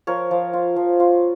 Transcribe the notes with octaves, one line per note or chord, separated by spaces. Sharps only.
F3 A#4 C#5
F3
F4
F3
F4